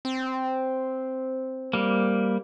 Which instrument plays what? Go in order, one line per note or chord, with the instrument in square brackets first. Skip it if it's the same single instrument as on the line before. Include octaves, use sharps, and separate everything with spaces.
[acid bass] C4
[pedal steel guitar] G3 A#3